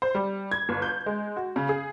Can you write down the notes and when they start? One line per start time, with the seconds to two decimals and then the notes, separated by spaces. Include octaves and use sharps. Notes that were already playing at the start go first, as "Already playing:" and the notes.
0.02 C5
0.15 G3
0.52 G#6
0.69 G1
0.82 G6
1.06 G#3
1.37 F#4
1.56 C#3
1.69 G#4